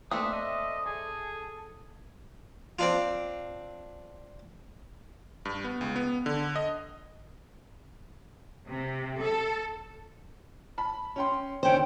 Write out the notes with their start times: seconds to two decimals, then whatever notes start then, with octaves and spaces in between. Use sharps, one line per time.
0.11 A3 A#3 C4 D4 B4 E5 D#6
0.33 D#5 E5 A5
0.86 G#4 A4
2.79 C4 D4 F4
5.45 G2
5.64 B3
5.81 C#2
5.96 B3
6.26 D3
6.56 D#5
8.68 C3
9.21 A4
10.78 A5 B5
11.16 C#4 G5 C6
11.63 D3 D#3 C#4 C5 G5